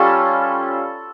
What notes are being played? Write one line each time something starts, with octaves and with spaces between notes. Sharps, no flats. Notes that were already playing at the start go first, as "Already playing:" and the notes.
Already playing: G3 C#4 F4 A4